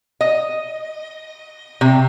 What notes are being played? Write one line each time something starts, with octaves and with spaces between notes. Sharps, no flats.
D#5
C3